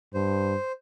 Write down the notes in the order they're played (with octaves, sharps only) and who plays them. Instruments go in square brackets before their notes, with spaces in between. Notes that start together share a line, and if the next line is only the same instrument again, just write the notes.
[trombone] G2 [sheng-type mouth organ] C5